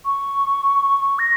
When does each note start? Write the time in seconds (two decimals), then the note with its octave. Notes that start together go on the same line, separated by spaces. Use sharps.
0.05 C#6
1.19 A#6